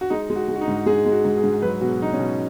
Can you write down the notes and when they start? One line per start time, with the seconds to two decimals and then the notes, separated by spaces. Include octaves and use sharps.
0.01 F#4
0.10 G#3 D#4
0.30 G#3
0.36 F#4
0.48 G#3
0.56 F#4
0.61 D#4
0.68 G#2
0.86 G#3 G#4
1.06 G#3
1.12 F#4
1.25 G#2
1.37 G#4
1.44 G#2
1.62 F#3 B4
1.81 B2 F#4
1.88 G#4
2.00 F#3 D#4
2.13 C#4
2.19 B2